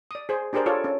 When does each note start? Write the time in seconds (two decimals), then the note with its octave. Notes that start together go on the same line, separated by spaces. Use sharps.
0.11 D5 D#6
0.29 G#4 C5
0.53 D4 G4 G#4 A#4 C5 D5
0.66 F4 A4 C#5 D5
0.84 C#4